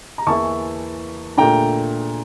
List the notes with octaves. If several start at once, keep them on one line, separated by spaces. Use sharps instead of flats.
A#5
E2 E3 A#3 E4 A5 C#6
A#2 A3 D4 G5 A#5